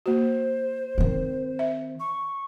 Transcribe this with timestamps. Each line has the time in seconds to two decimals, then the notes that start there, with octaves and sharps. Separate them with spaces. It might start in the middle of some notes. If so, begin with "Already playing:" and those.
0.06 A#3 F#4 C5
0.98 D#3 C4
1.59 E5
1.99 C#6